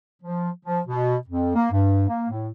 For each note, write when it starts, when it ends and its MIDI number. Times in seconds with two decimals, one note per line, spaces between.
0.22 0.49 53
0.66 0.80 53
0.87 1.16 47
1.28 1.52 41
1.55 1.69 58
1.72 2.07 43
2.08 2.29 58
2.29 2.48 45